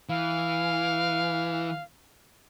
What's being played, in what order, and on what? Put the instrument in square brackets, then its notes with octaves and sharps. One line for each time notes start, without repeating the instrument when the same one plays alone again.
[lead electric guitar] E3 [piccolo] F5